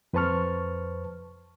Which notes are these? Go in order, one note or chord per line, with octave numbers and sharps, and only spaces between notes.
F2 B4 C5 A5 C#6 F6